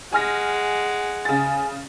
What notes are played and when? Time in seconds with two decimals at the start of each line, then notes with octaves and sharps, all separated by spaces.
0.13 G#3 F#5 G#5 F6 A#6
1.25 C#3 G#5 A6